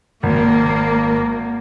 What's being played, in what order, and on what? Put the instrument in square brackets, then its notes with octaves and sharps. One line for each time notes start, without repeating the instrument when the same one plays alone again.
[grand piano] G#1 [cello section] A#3